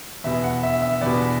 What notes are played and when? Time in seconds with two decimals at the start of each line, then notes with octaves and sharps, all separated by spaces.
0.24 E2 B2 E5
0.44 F#5
0.63 E5
0.82 E5
1.01 E2 D5
1.06 B2